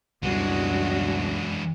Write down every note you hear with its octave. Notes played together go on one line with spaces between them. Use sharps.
C#2 F#2 B2 E3 G3 G#3 D4 F#4